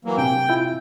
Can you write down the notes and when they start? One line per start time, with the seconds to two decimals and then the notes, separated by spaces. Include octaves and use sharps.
0.05 E3 F#3 A#3
0.17 C3 G5 G#5
0.49 E4 F4 G6